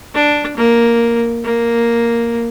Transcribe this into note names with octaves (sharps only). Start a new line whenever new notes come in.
D4
A#3
A#3